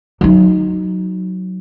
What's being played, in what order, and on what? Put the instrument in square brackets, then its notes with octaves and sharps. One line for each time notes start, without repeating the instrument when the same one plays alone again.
[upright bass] F#3 D#4